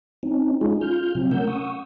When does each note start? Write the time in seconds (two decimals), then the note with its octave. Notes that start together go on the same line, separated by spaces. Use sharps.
0.23 C4 C#4 D#4
0.61 G#3 C#4 D#4 F4 G#4
0.81 F4 F6 G6
1.15 C3 F#3 C4
1.31 A3 C#4 A#4 F#5 E6 G6
1.47 F#5 C#6 D#6 E6